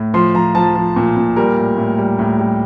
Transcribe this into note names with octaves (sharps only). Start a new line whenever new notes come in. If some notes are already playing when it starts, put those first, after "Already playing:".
Already playing: A2
F3 C6
F3 A#5
F3 A5
F3
A#2
A#2
G3 A#4
A2
A2
G3
A2
G3